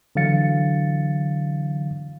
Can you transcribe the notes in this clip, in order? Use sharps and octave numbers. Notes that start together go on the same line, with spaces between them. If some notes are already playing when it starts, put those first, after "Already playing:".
D3 E3 F#3 F5 A6 C#7